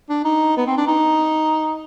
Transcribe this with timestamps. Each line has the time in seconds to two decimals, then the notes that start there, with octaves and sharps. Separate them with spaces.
0.09 D4
0.25 D#4
0.57 B3
0.66 C4
0.77 D4
0.87 D#4